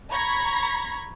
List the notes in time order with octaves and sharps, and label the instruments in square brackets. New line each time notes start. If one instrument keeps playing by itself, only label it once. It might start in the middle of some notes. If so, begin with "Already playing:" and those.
[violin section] A#5 B5 C#6 G#6 A#6 B6